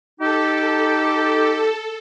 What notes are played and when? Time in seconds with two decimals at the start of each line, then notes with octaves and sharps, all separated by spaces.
0.20 D#4 G4 A4